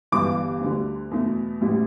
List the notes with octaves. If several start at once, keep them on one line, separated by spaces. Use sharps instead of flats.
G1 G2 E3 D6
D2 D3 G3
E2 B2 A3
A1 A2 G3